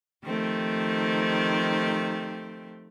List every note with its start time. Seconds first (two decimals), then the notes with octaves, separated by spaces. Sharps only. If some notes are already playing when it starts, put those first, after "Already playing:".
0.25 D#3 F3 A3 C4 G4